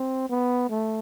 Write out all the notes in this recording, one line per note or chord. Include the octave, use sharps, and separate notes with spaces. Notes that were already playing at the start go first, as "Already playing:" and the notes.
Already playing: C4
B3
A3